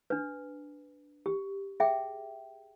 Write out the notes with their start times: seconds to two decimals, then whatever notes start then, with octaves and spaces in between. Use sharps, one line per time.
0.10 D4 B4
1.26 G4
1.80 G#4 E5 G5